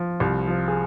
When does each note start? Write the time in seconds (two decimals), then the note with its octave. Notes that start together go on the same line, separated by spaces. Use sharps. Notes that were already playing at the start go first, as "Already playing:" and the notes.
Already playing: F3
0.20 C2
0.47 F3
0.68 G#4